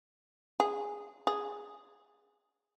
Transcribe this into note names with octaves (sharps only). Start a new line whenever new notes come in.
G#4
G#4